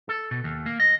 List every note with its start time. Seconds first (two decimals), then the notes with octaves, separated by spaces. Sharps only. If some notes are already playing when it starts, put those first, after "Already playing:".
0.09 A4
0.31 B2
0.44 D#2
0.66 A#3
0.80 D#5